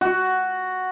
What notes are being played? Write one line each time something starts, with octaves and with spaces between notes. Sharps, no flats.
F#4